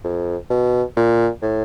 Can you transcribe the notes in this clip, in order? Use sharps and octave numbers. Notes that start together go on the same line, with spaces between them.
F2
B2
A#2
A2